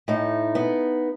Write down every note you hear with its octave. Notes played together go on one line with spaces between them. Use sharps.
A2 D#4
B3